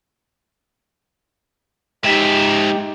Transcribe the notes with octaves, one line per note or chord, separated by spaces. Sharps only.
G#2 D#4 G4 E5